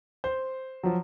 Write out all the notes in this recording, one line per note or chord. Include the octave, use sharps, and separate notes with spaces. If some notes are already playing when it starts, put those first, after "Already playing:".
C5 G6
F3 F#3